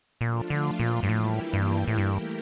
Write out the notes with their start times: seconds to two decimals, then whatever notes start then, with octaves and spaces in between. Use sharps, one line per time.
0.21 A#2 F3 A3 D4 F4
0.50 D3
0.80 A#2
1.03 G2
1.09 A2 E3 G3 A#3 E4 G4
1.53 G2
1.88 A2
1.98 G2 A3 E4 G4 A#4